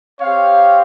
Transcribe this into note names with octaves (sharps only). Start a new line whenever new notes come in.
C4 G4 C#5 F5